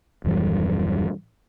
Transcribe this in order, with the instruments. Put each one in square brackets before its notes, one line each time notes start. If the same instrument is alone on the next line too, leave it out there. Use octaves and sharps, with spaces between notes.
[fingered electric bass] D#1 F#2 E3 G3